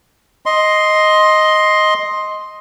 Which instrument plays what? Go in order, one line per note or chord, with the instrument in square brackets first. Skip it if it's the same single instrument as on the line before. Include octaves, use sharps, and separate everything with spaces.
[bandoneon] D#5 C6